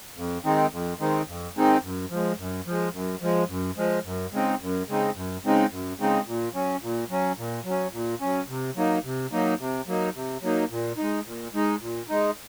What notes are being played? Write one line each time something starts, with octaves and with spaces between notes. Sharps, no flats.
F2
D#3 G#3 C4 D#4
F2
D#3 G#3 C4 D#4
F2
D#3 G#3 C4 D#4
F#2
F3 G#3
F#2
F3 G#3
F#2
F3 G#3
F#2
F3 G#3
F#2
C#3 G#3 C4 D#4
F#2
C#3 G#3 C4 D#4
F#2
C#3 G#3 C4 D#4
F#2
C#3 G#3 C4 D#4
A#2
F#3 C#4
A#2
F#3 C#4
A#2
F#3
C#4
A#2
F#3 C#4
C3
F#3 A#3 D#4
C3
F#3 A#3 D#4
C3
F#3 A#3 D#4
C3
F#3 A#3 D#4
A#2
G#3 D#4
A#2
G#3 D#4
A#2
G#3 D#4